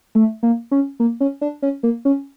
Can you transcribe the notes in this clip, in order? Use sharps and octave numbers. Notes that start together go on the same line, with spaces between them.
A3
A#3
C#4
A#3
C#4
D4
C#4
A#3
C#4